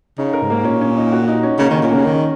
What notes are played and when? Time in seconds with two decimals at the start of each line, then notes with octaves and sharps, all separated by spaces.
0.18 C#3 D#4
0.33 A#4
0.42 G#2
0.50 A#3
0.65 A#2 C#4
0.81 C#4
0.97 D#4
1.12 F#4
1.23 F#4
1.28 D#4
1.43 C#4
1.58 C#3 A#3
1.70 D#3 C#4
1.82 A#2
1.91 C#3 A#3
2.05 D#3 C#4